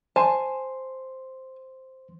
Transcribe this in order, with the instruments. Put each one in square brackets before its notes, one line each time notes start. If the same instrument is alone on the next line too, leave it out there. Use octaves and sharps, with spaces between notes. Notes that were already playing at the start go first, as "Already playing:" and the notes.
[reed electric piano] C5 C6 [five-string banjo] G#5 A5